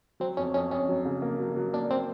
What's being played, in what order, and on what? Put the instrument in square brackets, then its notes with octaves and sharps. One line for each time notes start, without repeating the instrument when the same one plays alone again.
[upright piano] F#3 [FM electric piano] C4
[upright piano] F2 [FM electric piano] C#4
[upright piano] F2 [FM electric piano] C#4
[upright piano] F2 [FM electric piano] C#4
[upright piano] F#3
C#3
A#3
F#3
F#3
[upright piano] A#3 [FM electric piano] D4
[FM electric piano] C4